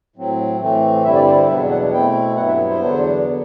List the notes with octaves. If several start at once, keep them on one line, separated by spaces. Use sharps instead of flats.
A2 F#3 C4
A2 E3 A3 C4
G2 D3 G3 C4 E4 E5
D5
C5
C5
E2 B2 F#3 B3 D4 E5
F#5
B2 A3 C4 E4 G5
G2 F#3 B3 E4 F#5
E5
C5
E2 D3 F#3 B3 D4
D3 F#3 B3